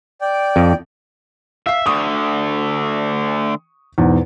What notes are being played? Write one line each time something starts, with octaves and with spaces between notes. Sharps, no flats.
D5 G5
F2
E5 F5 C7
D2 D3 C#6 D#6
E2 G#2 B2